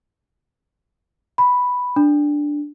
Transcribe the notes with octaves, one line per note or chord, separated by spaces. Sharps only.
B5
D4